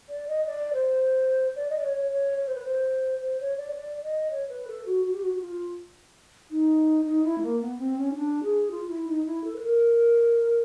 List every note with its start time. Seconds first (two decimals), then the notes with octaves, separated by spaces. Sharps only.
0.09 D5
0.28 D#5
0.46 D5
0.73 C5
1.56 D5
1.70 D#5
1.78 D5
1.83 C#5
1.97 C#5
2.11 C#5
2.38 C#5
2.47 C5
2.55 B4
2.63 C5
3.21 C5
3.40 C#5
3.57 D5
3.71 C#5
3.76 D5
4.03 D#5
4.31 C#5
4.49 B4
4.68 A4
4.86 F#4
5.05 F#4
5.13 G4
5.22 F#4
5.33 F#4
5.41 F4
6.51 D#4
7.06 D#4
7.24 E4
7.38 A3
7.42 A#3
7.61 B3
7.79 C4
7.98 C#4
8.12 D#4
8.15 D4
8.44 G#4
8.71 F4
8.89 E4
9.08 D#4
9.26 E4
9.44 A4
9.56 B4
9.62 A#4